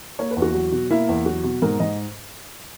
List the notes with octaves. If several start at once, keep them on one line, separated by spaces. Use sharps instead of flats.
A#3 C#5
B4
E2
F#4
F#3
B2
A#3 E4
E2
F#3 F#4
B2
G#2 A#4
G#2 D#5